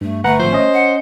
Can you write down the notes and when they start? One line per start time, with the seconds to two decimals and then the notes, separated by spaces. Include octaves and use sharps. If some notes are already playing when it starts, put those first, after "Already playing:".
0.01 G2 A3
0.24 G1 A3 B4 F#5 A#5
0.39 G#1 F3 C5
0.53 C#4 D#5
0.73 F#5